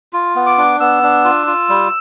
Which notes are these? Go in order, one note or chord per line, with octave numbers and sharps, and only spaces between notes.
F4
B3
D6
D4
B3 E6
D4
F4
F4
G3